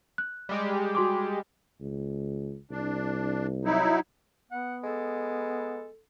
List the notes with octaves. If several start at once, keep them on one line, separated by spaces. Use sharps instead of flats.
F#6
G3 G#3 G4
F#4 C6 D6
C#2
C2 D4
F#3 D#4 E4
B3 F#5
G#3 A4